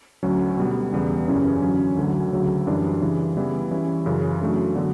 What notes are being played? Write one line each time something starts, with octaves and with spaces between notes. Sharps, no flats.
D2 D3 F#3 C#4
B2 G3 B3
E2 C#3 G3 B3
F#2 C#3 E3 G3 C#4
D3 F#3 C#4
D2 D3 F#3
D2 C#3 F#3
F#2 E3 G3 D4
C#3 E3 G3
C#3 E3 G3 B3 E4
E3 G3 C#4 E4
F#2 C#3 E3
C#3 F#3 A3 D4 F#4
D3 F#3 B3 D4